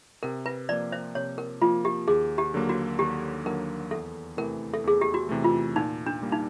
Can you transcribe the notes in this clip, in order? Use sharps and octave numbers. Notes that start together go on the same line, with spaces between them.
C3 A#4
B4
F3 A#3 D5
C5
C3 C#5
A#4
F3 A#3 F4
G4
D#2 G#4
G4
D3 F#3 A#3
F#4
D#2 G4
D3 F#3 A#3 A#4
E2 A4
C3 E3 A3 A#4
A4
E2 G#4
G4
F#4
C3 E3 A3
F4
A#2 D#4
D4
G3 A#3
D#4